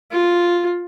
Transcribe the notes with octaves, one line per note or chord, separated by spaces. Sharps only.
F4